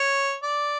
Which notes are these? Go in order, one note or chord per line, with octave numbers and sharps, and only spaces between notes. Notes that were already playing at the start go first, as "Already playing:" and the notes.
Already playing: C#5
D5